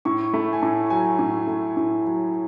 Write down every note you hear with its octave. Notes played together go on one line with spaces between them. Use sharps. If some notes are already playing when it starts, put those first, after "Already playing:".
A2 C#6
A3 B5
G#5
A2 A5
F#3 G#5
A2
A3
A2
F#3